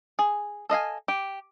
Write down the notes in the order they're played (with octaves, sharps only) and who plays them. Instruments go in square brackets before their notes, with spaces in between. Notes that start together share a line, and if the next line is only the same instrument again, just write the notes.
[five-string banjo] G#4
A4 D#5 F5 G#5
G4